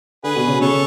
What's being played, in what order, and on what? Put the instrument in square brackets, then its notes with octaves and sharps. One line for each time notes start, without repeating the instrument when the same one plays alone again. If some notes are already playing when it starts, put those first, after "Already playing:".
[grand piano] D3 [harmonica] G#4 B4
[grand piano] B2
C#3
[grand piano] C#3 [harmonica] A4 C#5